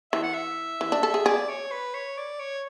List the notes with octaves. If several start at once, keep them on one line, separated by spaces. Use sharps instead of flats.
E3 E5
F#5
E5
E3
D4
A4
G#4
G#4 D5
C#5
B4
C#5
D5
C#5